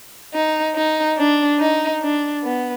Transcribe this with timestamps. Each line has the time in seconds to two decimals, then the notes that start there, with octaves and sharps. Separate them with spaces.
0.34 D#4
0.75 D#4
1.17 D4
1.59 D#4
2.01 D4
2.43 B3